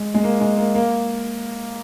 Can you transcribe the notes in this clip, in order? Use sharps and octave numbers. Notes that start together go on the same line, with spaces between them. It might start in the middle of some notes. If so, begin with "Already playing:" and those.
Already playing: G#3
G#3
A#3
G#3
A#3
A#3